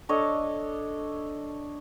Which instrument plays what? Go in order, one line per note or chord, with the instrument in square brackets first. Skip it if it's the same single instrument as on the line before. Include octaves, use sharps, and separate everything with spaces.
[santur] D4 A4 C#5 D#5